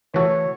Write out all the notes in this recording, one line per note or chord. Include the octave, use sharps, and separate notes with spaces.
E3 A3 F#4 A4 C#5